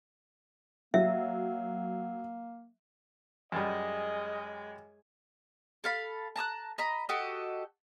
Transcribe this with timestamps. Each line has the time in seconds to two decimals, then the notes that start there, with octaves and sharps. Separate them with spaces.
0.94 F#3 A#3 E5
3.52 F#2 G3 G#3 D#5
5.84 A4 F5 B5
6.36 A5 A#5 D#6 F#6
6.78 D#5 A#5 B5
7.09 F#4 G4 A4 D#5